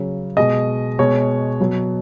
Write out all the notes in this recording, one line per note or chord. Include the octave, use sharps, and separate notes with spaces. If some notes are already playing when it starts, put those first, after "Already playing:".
Already playing: C#3 F#3
B2 G#3 D#5
B2 G#3 C#5
B2 F#3